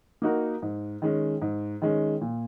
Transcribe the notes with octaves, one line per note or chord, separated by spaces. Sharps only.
A#3 D#4 F#4 A#4
G#2
D#3 G#3 C#4
G#2
D#3 G#3 C#4
A#2